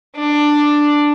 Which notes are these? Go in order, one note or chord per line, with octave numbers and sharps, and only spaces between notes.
D4